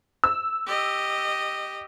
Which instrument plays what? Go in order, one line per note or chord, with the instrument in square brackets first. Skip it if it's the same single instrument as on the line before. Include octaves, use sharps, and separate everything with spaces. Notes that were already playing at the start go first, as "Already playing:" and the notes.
[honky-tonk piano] E6
[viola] G4 D#5